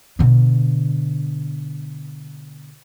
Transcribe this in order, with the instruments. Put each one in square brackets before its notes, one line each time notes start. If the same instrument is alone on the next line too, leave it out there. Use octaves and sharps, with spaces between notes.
[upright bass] B2 D3